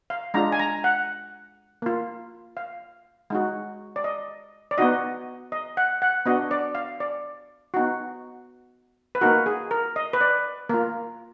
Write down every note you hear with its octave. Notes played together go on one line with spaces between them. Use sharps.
F5
G#3 D4 F4 A#5
G#5
A#5
F#5
A#3 F4
F5
G#3 D#4 F#4
D5
D#5
D5
B3 D#4 F#4 D#5
D#5
F#5
F#5
B3 D4 F#4 D#5
D5
F5
D5
B3 D#4 F#4
B4
A#3 D#4 F#4 A#4
G#4
A#4
D#5
B4
D5
A#3 F4 A#4